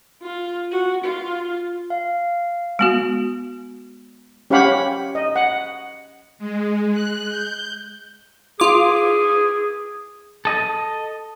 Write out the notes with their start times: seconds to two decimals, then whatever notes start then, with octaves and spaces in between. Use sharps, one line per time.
0.23 F4
0.72 F#4
1.04 F4
1.90 F5
2.79 G#3 B3 F#4
4.50 C#4 G4 C#5 F5 F#5 B5
5.15 D#5
5.36 F#5
6.38 G#3
6.92 F#6
7.28 G6
8.60 F4 G#4 D6
10.45 A4 D#5